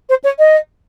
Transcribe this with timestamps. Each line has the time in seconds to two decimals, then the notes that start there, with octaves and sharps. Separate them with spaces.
0.09 C5
0.24 C#5
0.39 D#5